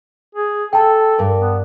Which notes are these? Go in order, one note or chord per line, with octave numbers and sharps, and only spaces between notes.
G#4
G#4 A4 G5 A5
G2 A#4 D5
B3